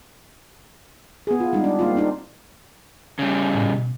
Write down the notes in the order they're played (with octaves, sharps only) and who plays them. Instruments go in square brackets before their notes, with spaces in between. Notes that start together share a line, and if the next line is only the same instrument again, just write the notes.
[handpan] B3 G#4
F4
G3 G#3 D#4
D4
A#3 C4 F4
C4 D4 D#4
[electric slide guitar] C#3 G3
[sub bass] A2
B2